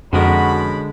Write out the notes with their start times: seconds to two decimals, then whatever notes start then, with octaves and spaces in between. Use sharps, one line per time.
0.13 F2 B2 D3 G#3 C#4 F#4 A#4 B5